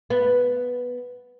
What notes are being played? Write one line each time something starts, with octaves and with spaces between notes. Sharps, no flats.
B3